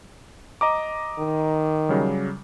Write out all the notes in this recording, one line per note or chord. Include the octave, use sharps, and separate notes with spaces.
D#5 A#5 D6
D#3
C#3 F#3 G3